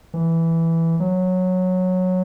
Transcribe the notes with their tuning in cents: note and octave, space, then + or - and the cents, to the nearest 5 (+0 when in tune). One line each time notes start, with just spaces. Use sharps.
E3 +0
F#3 -10